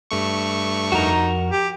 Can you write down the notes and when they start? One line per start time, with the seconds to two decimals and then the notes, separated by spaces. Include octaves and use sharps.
0.11 G2 A3 C#6
0.92 F2 D#4 F#4 A#4 A#5
1.51 G4